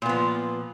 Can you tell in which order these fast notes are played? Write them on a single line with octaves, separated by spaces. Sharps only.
A#2 B3 F3